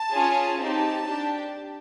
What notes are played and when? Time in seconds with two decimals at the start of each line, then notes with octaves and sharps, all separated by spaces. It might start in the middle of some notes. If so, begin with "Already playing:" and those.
Already playing: A5
0.13 C#4 F4 G#4
0.59 C4 D#4 G4 A5
1.06 D4 G4